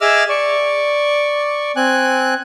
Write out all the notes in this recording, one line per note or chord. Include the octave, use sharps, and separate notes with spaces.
G#4 D#5 E5 D6 E6 F6
D5 C#6
C4 G#5 F#6